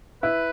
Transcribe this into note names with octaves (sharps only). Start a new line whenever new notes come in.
E4 B4